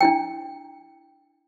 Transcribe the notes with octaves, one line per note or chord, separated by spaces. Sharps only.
D4 E4 G5